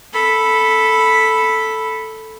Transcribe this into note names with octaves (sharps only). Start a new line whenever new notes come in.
A4 B5